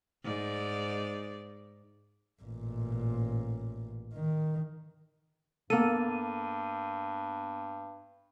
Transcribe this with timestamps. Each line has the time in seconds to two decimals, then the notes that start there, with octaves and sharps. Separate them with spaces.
0.24 G#2 D5
2.43 A1 A#2
4.14 D#3
5.70 G2 A#3 B3 A4 D#7